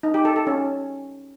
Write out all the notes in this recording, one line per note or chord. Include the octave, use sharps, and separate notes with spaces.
D#4
G4
A4
A4
C#4